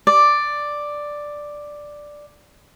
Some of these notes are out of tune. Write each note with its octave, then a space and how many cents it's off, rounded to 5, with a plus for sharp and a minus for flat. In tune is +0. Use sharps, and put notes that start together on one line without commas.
D5 +5